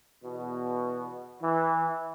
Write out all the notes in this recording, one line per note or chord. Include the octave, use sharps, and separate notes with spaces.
E2 B2
E3